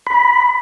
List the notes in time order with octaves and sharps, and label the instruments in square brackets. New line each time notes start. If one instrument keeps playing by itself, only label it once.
[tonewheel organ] B5